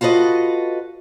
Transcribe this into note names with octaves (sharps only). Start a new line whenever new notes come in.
F4 F#4 A4 B4 D#5